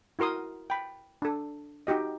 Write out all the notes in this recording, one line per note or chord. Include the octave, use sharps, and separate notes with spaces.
E4 F#4 A#4 C6 D#6
G5 B5
D4 A4
D#4 F#4 G4 D#5